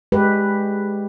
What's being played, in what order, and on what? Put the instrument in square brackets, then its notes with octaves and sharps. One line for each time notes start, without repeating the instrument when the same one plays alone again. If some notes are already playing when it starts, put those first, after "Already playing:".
[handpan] G#3 G4 B4